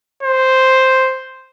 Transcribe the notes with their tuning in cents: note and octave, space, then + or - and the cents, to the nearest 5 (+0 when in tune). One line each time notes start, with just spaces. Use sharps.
C5 +0